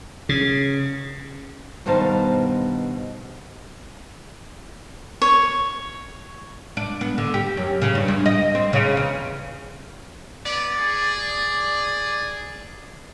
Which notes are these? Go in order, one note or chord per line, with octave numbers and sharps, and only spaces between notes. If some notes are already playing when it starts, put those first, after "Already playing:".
C#3
G2 B2 D#3 C5 F5 A5
C#5
D4
B3
D3
G4
F#2
C#3
G2
E2
D#5
C4
C#3
E2
B3 D5
G#4